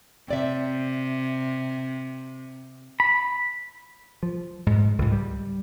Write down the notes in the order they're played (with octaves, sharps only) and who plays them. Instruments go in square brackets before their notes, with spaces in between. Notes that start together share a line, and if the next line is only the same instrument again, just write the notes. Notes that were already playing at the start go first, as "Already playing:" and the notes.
[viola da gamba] C3 [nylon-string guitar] C4 D5 E5
[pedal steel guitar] B5
[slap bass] F3
G#2
C#2 G#2
G3